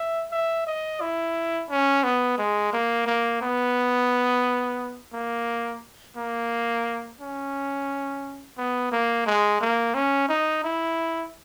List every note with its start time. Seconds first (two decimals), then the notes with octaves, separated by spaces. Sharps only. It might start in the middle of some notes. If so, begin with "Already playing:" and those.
Already playing: E5
0.31 E5
0.67 D#5
1.01 E4
1.70 C#4
2.03 B3
2.38 G#3
2.73 A#3
3.06 A#3
3.41 B3
5.13 A#3
6.17 A#3
7.20 C#4
8.58 B3
8.92 A#3
9.26 G#3
9.61 A#3
9.94 C#4
10.29 D#4
10.64 E4